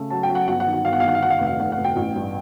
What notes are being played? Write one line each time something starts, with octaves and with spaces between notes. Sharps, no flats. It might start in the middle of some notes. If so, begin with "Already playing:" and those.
Already playing: C#3 A3
F#3 A5
G5
F#3
F#5
G1 F#5
F#5
D#3
F#5
G1 F5
F#5
F5
D#3 F#5
F5
D#3 F#5
F5
F1 F#5
F5
F1 F#5
F#5
F1
G5
A1
G2